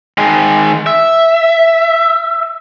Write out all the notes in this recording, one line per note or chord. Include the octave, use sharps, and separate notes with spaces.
D#3 G#3
E5